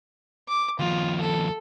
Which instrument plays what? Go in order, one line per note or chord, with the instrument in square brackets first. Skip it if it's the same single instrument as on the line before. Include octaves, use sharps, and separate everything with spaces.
[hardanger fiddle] D6
[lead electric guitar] D#2 F3 [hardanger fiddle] F4
[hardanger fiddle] A4